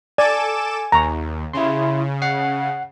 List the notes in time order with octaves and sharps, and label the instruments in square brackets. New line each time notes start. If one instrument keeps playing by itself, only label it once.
[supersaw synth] A4 D6 E7 [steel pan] D5 [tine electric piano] G#5
[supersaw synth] D#2 [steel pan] A#5 C#6
[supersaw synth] C#3 [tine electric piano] E4 C6
[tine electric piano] F#5 C7